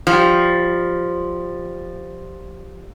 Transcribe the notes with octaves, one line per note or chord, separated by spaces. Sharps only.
F3 G3